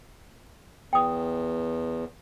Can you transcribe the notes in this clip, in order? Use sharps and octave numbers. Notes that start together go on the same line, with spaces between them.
E2 G5 D#6